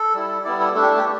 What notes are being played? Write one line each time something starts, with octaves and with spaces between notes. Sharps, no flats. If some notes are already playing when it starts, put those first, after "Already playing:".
Already playing: A4
G3 E4
G3 B3 E4 D5
A4
A3 D4 A4
G4
G4